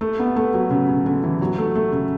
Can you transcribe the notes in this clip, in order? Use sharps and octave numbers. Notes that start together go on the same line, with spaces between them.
A3
B3
A3
F#3
C#3
C#3
D3
E3
F#3
A3
A3
C#3